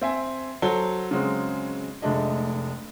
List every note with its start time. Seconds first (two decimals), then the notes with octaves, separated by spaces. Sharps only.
0.01 C4 E5 G#5
0.62 F#3 A4 C5 G7
1.11 C#3 F#3 G#3 C4
2.02 F1 G#3 A3 D4 D#5